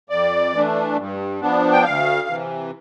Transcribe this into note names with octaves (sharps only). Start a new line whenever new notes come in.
F2 D5
E3 A3 D4
G2
F3 B3 D4
G5
D2 F5
C3 E3